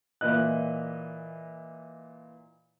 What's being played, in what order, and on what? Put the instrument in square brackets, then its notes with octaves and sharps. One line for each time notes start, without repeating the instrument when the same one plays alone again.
[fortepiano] A#2 E3 D#5 F#6